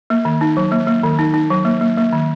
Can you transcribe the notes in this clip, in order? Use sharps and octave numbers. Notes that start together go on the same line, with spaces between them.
A#3
D#3
D#4
F#3
A#3
A#3
D#3
D#4
D#4
F#3
A#3
A#3
A#3
D#3